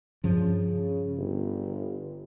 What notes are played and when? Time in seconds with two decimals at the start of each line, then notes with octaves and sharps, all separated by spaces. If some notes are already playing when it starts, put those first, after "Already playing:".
0.24 G2 C#3 F3
1.18 G1